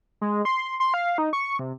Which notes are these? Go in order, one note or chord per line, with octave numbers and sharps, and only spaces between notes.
G#3
C6
C6
F5
D#4
C#6
C3